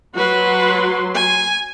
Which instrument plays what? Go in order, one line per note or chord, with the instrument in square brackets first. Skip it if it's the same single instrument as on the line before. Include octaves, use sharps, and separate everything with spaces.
[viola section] F#3 C6 [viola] F#4 B4
[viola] G#5